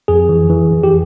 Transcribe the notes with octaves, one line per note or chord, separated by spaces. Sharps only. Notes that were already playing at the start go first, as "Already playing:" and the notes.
F2 G#4
E3
E3
F2
G4